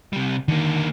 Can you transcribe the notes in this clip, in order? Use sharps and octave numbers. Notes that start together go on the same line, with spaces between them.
C3 G3
D3 D#3 A#3